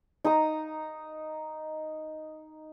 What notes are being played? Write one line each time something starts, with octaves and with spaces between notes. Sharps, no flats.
D#4 A#5 D#6